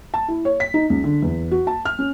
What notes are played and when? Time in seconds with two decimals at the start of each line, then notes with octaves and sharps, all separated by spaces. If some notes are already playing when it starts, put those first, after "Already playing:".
0.14 A5
0.28 E4
0.45 C#5
0.60 B6
0.74 D#4
0.90 C#2
1.04 D3
1.22 E2
1.51 F#4
1.67 A5
1.85 F6
1.99 C#4